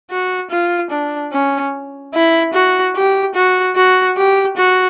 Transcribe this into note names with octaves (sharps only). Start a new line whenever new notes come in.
F#4
F4
D4
C#4
E4
F#4
G4
F#4
F#4
G4
F#4